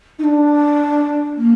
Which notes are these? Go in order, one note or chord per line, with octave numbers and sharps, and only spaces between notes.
D#4
D4
A#3